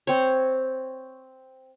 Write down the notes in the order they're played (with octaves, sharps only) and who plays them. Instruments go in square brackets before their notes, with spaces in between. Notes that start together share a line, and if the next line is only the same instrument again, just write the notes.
[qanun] C4 C#5